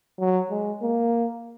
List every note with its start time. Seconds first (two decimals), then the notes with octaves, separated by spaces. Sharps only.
0.19 F#3
0.50 G#3
0.82 A#3